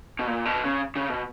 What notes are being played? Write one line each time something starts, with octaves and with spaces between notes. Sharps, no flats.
B2
A#2
B2
C#3
C#3
B2